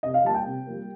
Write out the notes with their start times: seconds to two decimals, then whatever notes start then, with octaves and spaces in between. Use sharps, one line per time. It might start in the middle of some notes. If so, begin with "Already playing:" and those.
0.03 C3 D#5
0.14 F5
0.24 G3 A#3 A5
0.34 G5
0.46 C3
0.67 G3 A#3